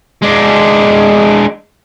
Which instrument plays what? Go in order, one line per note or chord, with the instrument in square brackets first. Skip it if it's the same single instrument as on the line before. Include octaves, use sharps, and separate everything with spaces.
[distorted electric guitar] G#3 D4